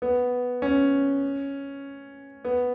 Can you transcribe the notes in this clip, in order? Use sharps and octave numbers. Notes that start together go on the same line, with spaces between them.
B3
C#4
B3